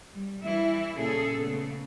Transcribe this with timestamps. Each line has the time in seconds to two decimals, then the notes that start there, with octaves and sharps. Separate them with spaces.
0.13 G3
0.43 E3 G3 E4
0.96 A#2 C#3 C#4 G#4 A4
1.38 C#3 A3 B3